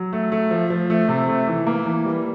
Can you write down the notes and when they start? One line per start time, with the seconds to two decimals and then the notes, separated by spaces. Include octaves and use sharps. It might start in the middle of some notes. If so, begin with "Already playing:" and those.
Already playing: F#3
0.13 A3
0.32 A3
0.51 F3
0.70 F3
0.90 A3
1.09 C3
1.28 A3
1.47 E3
1.67 A#3
1.86 E3
2.05 G3